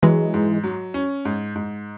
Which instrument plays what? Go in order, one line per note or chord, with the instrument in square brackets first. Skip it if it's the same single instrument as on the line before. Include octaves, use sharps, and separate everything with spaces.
[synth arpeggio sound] E3 G#3 [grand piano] F#3
[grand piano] G#2
F#3
C#4
G#2
G#2